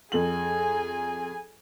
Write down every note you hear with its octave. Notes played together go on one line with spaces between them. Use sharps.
F2 G#4 G#5 F#7